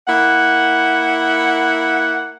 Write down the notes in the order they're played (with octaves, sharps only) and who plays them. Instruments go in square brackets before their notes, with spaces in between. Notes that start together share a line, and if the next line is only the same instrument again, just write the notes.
[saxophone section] A#3 E4 F#5